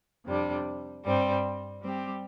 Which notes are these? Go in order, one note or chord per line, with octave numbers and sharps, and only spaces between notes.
F2 C3 G3 D4
G2 G3 C4
G3 C4 G4